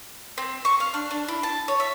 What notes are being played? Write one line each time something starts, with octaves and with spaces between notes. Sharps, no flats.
C4
C#6
F5
D4
D4
E4
A5
C#5
E5